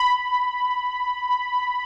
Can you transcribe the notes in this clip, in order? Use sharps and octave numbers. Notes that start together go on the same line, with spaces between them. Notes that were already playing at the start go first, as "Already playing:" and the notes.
Already playing: B5